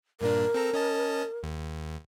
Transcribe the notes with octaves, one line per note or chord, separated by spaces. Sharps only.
G2 A#2 D4 A#4
C4 A4 A#5
C#4 D#5 A5
D#2